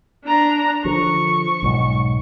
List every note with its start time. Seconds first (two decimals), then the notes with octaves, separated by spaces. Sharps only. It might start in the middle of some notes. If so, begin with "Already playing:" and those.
0.24 D4 A#5
0.85 D3 F3 C#6
1.63 B1 G#2